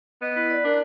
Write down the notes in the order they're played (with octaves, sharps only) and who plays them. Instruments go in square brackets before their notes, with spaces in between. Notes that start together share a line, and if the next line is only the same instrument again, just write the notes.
[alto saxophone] B3 [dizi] D#5
[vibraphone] E4 [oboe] B4
[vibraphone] D5
[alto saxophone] D4 [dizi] A#4